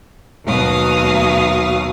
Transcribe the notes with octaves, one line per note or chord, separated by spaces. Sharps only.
D#2 B2 F#3 F5 D#6